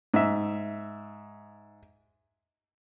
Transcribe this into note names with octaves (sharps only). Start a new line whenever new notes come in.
G#2 E5